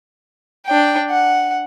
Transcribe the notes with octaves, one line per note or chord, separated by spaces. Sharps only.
D4 G5
F#5